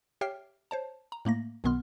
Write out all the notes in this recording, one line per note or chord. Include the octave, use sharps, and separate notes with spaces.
G4 C#5 E5 G5 F6 C7
C5 C#5 A5
A#5
A2 A3 A#3 A#6
B1 B2 D#3 B3 C6 F6